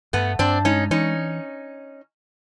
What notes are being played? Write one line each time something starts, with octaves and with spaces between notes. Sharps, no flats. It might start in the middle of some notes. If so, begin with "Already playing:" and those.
G2 A3 B3
G2 C4 D4
G#3 C#4 D#4
E3 C#4 D#4